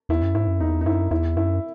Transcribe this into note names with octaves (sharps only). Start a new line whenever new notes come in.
E2 E4
F#2
G#2 E4
F#2
E2 D#4
D#4
F#2 E4
E2 E4
F#2 E4